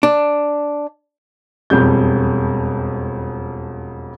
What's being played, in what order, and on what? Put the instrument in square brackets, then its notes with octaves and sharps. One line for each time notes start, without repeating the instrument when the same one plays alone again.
[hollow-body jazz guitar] D4
[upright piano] E1 F2 G3 G6